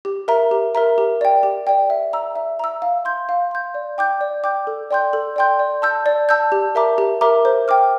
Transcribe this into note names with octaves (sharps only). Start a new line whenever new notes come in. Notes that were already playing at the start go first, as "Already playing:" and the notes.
G4
A#4 E5 A#5
G4
A#4 E5 A#5
G4
D5 G5
G4
D5 G5
E5
A#5 E6
E5
A#5 E6
F5
C6 G6
F5
C6 G6
D5
G5 D6 G6
D5
G5 D6 G6
A4
D5 G5 C6 G6
A4
D5 G5 C6 G6
D5
A5 E6 G6
D5
A5 E6 G6
G4
A#4 E5 A#5 D6
G4
A#4 E5 A#5 D6
C5
G5 D6 F6